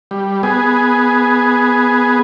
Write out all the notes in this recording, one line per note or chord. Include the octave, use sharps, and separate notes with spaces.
G3
B3 G#4